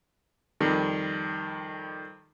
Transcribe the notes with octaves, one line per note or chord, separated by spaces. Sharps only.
F2 D#3 G3